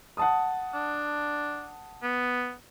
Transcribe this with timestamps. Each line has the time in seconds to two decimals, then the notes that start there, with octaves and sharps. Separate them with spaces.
0.17 F#5 A5 D#6
0.74 D4
2.03 B3